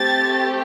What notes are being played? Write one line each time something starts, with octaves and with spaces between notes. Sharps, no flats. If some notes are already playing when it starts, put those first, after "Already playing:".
Already playing: A3 C4 G4 A6